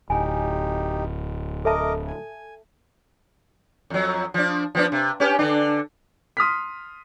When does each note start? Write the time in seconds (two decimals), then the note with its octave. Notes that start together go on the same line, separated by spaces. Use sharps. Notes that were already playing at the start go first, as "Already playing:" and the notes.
0.10 D1 D#4 G4 G#5
1.65 A4 A#4 D#5 E5 A5 D6
2.08 G#5
3.90 F2 F#3
4.34 F3 D4
4.75 F3 B3 D4
4.92 C3
5.20 C#4 G4 B4
5.39 D3 D4
6.37 C6 D#6 F6 B6